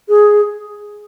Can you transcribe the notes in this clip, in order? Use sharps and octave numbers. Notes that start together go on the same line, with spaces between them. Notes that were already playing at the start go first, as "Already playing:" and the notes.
G#4